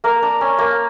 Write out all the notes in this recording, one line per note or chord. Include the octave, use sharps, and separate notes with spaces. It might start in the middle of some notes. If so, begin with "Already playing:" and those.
A#3 A#4
D4
C#4
A#3